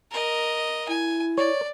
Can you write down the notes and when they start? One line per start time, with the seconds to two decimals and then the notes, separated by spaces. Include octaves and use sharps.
0.11 A#4 D#5
0.88 E4 G#5
1.38 C#5 D5